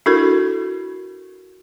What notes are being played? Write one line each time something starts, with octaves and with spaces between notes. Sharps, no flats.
D4 E4 F#4 A4 A#4